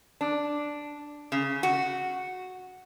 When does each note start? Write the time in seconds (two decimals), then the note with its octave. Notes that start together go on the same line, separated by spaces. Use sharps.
0.21 D4
1.32 C#3
1.63 F#4